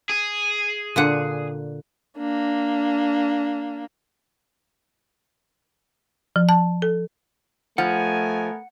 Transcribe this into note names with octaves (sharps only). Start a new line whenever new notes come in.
G#4
A#2 D3 F#5
A#3 D4
F3
A5
A4
F3 A3 B3 A#4 F#5 G#5